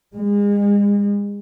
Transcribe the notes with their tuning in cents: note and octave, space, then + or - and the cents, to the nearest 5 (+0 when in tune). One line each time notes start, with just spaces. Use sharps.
G#3 -35